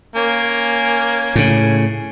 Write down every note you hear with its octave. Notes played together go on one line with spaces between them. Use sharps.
A#3 C#4 G#5
A2 C#3